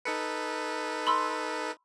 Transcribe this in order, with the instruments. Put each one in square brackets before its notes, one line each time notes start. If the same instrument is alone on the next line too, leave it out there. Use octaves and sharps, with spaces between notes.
[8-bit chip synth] D#4 A4 B4 [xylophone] C#7
[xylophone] B5 C6 E6